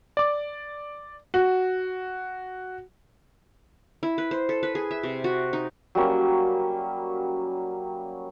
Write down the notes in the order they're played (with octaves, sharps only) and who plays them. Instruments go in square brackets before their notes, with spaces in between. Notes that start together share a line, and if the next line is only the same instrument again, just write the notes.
[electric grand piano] D5 D6
[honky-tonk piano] F#4
[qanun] E4
B4
C5
A4
B4
G#4
E5
C3
F#4
D#4
[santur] F#3 G3 A#3 C#4